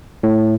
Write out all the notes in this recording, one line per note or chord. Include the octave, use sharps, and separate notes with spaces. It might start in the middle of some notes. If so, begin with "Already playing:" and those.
A2